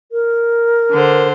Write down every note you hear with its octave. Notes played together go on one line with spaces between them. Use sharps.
A#4
D3 C5